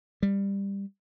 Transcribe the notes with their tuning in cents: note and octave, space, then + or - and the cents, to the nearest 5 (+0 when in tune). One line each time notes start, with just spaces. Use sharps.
G3 +15